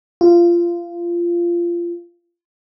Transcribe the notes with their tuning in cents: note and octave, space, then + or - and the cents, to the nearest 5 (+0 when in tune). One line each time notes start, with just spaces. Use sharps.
F4 -20